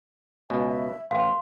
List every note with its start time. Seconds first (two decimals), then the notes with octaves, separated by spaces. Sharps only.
0.50 C#2 B2 G#5
0.68 E5
1.11 A1 F5 C6